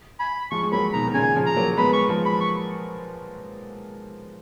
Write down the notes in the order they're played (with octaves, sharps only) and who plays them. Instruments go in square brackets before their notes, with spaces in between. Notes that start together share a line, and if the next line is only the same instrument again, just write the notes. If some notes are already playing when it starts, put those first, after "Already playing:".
[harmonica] G#5 B5
[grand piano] F3 G#3 [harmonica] C#6
[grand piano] G#3
[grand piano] F#3 A#3 [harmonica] B5
[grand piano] B2 D#3 [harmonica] A#5
[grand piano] D#3
[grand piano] A#2 C#3 [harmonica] G#5
[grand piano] C#3 F3
[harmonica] A#5
[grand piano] F#3 A#3
[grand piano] G#3 B3 [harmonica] B5
[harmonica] C#6
[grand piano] F3 G#3
[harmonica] B5
C#6